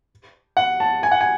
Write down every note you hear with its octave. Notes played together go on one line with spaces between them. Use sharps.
F#5
A5
G#5
F#5
G#5